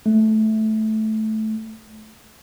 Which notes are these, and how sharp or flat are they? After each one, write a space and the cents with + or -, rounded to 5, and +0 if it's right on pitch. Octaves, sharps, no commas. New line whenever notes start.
A3 -10